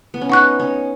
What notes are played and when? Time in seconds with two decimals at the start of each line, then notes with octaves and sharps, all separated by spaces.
0.14 B3
0.21 C#4
0.29 D#4 F#5 C#6 F#6
0.60 C#4